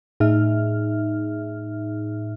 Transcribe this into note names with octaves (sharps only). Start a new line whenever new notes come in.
A2 D#4 G#4 E5 F6